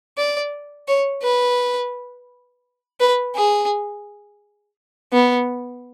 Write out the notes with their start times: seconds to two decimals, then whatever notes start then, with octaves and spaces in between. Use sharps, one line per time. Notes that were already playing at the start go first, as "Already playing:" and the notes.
0.17 D5
0.88 C#5
1.23 B4
3.00 B4
3.36 G#4
5.13 B3